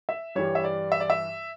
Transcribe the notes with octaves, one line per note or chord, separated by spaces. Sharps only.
E5
G2 E3 G3 C#5
E5
D5
E5
D5
E5